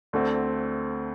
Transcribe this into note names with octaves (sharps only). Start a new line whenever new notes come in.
D2 D3 A3 C4